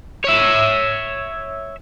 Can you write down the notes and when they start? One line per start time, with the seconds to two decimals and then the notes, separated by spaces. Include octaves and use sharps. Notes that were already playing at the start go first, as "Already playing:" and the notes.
0.24 C#5 E5